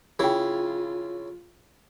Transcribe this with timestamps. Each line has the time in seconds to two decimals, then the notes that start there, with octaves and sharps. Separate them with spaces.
0.19 C#3 E4 F4 G#4 G5